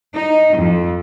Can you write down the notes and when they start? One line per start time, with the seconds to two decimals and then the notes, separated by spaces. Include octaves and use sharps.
0.14 D#4
0.57 F2